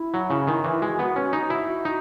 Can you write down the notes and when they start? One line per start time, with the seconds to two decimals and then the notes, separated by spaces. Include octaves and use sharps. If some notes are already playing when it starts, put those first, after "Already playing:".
Already playing: E4
0.14 F#3
0.30 C#3
0.47 D#3
0.64 E3
0.81 G#3 F#4
0.99 B3
1.16 C#4
1.33 D#4
1.50 E4
1.85 D#4